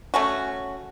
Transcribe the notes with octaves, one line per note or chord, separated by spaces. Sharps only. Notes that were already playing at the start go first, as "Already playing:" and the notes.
A3 C#4 F#4